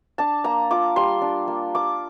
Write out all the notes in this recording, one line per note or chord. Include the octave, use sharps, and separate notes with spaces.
D4 A5
A#3 A#5
F4 D6
G3 C6
D4
A#3
F4 D6